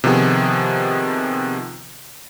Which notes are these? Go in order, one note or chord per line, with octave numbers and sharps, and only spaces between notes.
C3 D#3 F3 B3 G#4